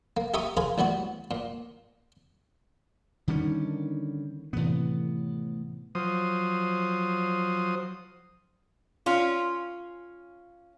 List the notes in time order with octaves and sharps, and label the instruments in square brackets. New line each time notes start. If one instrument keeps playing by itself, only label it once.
[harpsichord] A#3
G4 E5 A#5 C#6 D#6
F4 G#4 A#4 B4
A1 G3 B3 F#4
A#2
[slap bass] D3 G3 C#4 [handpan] D#3
[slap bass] A2 B3 [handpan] C3 E3
[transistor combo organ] F3 F#3 C5 D#6
[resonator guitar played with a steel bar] C#4 F4